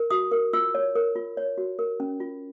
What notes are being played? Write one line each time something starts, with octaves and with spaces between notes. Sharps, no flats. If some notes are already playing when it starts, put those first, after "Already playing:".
Already playing: A#4
F#4 D#6
A#4
F4 E6
C#5
A#4
F4
C#5
F#4
A#4
C#4
F4